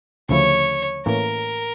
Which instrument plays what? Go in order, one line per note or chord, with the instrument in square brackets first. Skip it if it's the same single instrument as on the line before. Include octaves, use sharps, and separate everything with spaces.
[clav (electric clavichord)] D2 C#3 F3 A3 E4 [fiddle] C#5
[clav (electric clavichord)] A2 E3 A#3 C#4 [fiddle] A#4